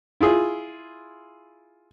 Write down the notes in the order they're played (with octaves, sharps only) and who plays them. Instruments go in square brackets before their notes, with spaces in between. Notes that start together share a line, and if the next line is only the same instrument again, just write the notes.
[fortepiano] E4 F4 G#4